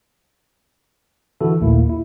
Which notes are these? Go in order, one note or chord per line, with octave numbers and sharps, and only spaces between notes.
D3 E3 E4 F#4 A4
A#1 D#2 A#2 A3 A#3 E4
E4